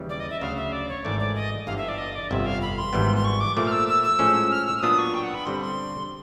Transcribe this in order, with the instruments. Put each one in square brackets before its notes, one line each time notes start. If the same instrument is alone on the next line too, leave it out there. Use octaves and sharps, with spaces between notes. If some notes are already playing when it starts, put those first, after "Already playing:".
Already playing: [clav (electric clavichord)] D#2 C#3 E3 G3
[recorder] D5
D#5
E5
[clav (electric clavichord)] D2 C#3 F#3 [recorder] F5
[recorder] E5
D5
C#5
[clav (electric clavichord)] G#1 G#2 E3 A3 [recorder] D5
[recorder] D5
D#5
[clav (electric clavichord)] G1 G2 E3 [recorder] F5
[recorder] E5
D5
D#5
D5
[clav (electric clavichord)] G1 F2 C3 [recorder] E5
[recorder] F5
B5
C6
[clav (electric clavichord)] G#1 G#2 E3 G3 B3
[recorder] C6
C#6
D6
[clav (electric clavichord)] A#2 F3 A3 [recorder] D6
[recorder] F6
E6
E6
E6
[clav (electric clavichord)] A2 F3 G#3 C#4
[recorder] F6
E6
E6
[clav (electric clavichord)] A#2 F#3 B3 D4 F4 [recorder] D#6
[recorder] C#6
G5
F#5
B5
[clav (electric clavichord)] G2 D3 G3 C4 [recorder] C6
[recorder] C6